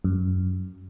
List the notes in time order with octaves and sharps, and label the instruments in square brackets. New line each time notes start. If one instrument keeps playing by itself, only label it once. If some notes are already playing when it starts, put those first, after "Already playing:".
[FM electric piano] F#2